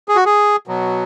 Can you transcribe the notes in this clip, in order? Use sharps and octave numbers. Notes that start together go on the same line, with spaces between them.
G#4
F#4
G#4
B2 F#3